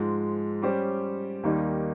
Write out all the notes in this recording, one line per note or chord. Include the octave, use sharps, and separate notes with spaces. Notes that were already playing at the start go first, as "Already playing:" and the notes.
Already playing: G#2 F3 G#3
G3 C#4 G4 C5
D#2 D#3 G3 A#3 D#4